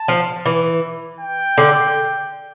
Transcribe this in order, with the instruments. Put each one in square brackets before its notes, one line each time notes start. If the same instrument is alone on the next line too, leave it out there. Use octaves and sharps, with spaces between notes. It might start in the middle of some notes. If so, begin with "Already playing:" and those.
Already playing: [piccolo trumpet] A5
[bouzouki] F3
E3
[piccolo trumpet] G5
[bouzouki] D3